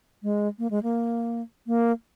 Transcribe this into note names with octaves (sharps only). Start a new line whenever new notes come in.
G#3
A#3
G#3
A#3
A#3